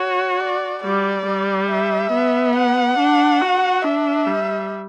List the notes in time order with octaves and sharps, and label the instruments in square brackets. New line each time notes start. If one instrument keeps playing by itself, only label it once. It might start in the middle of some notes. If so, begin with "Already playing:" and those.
Already playing: [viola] F#4 [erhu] C#5
[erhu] D5
[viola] G3 [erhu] D5
[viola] G3
[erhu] E5
[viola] B3
[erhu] F#5
[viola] D4
F#4
[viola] D4 [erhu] E5
[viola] G3